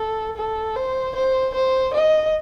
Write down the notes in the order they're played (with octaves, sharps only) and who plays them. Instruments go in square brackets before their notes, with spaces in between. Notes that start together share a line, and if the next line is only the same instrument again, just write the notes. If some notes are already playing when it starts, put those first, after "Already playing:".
Already playing: [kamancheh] A4
A4
C5
C5
C5
D#5